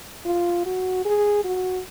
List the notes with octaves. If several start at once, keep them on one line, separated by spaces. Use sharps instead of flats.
F4
F#4
G#4
F#4